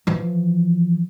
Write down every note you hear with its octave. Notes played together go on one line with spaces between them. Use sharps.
E3 F3